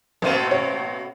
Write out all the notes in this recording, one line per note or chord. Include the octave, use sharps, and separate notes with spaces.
A1 B2 A3 A#3 C5 D#7
C#5